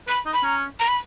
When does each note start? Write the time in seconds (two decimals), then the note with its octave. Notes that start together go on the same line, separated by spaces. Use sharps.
0.08 B4 B5
0.26 D#4
0.33 B5
0.43 C#4 A#5
0.80 A#5
0.88 B5